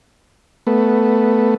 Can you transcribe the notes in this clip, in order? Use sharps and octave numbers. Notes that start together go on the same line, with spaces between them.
A3 B3